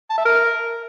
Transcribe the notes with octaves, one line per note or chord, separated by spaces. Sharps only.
A5
E5
A#4